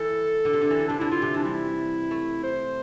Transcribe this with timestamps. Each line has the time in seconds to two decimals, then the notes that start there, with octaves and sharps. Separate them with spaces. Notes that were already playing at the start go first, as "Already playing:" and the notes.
Already playing: E3 A4
0.45 D3
0.53 C3
0.62 D3
0.70 E3
0.79 D3
0.88 C3 D4
0.99 D3 E4
1.11 D3 F4
1.22 C3
1.34 E3 D4
1.44 G3 E4
2.11 A3
2.43 C5